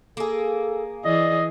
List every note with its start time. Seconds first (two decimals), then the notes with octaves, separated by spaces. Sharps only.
0.17 A#3 G#4 A4
1.05 E3 G#4 D5 D#5